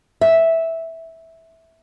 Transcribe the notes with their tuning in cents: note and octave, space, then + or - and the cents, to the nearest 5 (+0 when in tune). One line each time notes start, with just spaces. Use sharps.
E5 -10